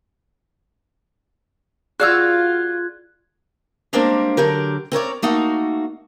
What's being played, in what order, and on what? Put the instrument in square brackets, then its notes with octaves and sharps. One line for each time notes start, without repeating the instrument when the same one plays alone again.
[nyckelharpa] F4 [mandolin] F#4 F5 E6 [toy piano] G#4 D5 [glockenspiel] F#6 G#6
[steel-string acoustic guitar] G3 G#3 A#3 C4 D4 A#4
D3 F#3 G4 A#4
C4 A#4 C#5 D5
A3 A#3 D#4 F#4